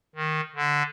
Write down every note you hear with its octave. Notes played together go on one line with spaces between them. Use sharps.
D#3
D3